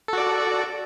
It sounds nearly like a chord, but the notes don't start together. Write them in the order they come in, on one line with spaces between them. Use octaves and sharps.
A4 F#4 D5